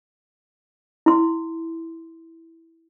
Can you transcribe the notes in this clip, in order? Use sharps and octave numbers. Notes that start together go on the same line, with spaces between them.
E4 C6